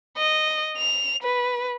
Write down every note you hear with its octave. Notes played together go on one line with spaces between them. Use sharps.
D#5
F7
B4